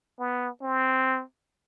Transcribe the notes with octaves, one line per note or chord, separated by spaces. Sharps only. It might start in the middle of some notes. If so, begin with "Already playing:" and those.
B3
C4